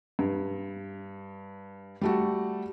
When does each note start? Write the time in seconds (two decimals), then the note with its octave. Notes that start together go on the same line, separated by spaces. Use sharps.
0.19 G2
2.01 G3 A3 F#4